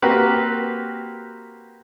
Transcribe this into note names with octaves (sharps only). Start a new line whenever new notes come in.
A#3 C4 F#4 G4 A#4 B4